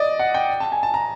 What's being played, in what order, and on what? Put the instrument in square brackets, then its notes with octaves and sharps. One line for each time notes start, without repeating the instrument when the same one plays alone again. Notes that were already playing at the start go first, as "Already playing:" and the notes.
Already playing: [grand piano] D5 D#5
F#5
G5
A5
G#5
A5
A#5